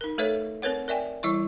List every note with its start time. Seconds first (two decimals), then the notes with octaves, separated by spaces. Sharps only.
0.01 D#4 A#4
0.18 A3 A4 B4 C#5 E5
0.62 C4 A#4 B4 C#5 F#5
0.88 A#4 D5 E5 G5 G#5
1.23 E3 G3 E4 C#6